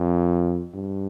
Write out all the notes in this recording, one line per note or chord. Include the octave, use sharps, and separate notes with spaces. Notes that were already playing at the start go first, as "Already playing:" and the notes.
Already playing: F2
G2